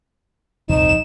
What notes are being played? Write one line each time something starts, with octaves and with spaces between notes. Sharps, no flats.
D#1 C2 F2 F3 D#4 E7